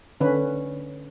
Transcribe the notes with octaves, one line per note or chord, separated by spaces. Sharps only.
D3 C#4 B4